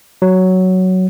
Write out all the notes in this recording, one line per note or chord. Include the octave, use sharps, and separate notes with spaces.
F#3